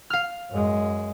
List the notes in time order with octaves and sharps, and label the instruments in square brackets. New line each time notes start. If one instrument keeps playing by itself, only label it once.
[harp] F5 F6
[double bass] F#2 G#3